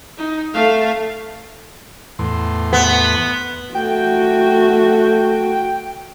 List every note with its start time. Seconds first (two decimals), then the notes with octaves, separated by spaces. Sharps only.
0.17 D#4
0.54 A3 F5
2.19 E2 A2 C6
2.73 B3
3.75 A3 F#4 G5